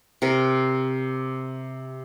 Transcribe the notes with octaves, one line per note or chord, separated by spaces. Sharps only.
C3 A#4